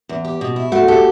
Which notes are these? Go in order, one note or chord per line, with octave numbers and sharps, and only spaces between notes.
E2
G4
B2
E4
A3 F#4
G4 A4